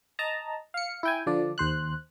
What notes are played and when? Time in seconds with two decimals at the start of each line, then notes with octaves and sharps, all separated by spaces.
0.19 D#5 A5 A#5
0.74 F5 C#7
1.03 E4 G5 G#5
1.27 D3 F3 D4 D5
1.58 D#2 C5 F#6